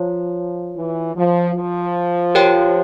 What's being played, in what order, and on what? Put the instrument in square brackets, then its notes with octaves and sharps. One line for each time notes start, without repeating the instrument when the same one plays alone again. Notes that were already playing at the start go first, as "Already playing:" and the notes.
Already playing: [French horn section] F3 [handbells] F4 C#5
[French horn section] E3
F3
F3
[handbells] G4 A#4 C#5 G5